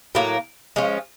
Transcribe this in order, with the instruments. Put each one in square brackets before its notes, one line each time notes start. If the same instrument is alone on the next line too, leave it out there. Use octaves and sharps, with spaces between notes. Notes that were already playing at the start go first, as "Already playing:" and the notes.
[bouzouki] A2 F#3 A#3
F3 G#3 C#4